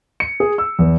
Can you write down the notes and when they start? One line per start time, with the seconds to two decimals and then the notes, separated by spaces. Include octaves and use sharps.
0.20 C#7
0.40 G#4
0.58 E6
0.79 E2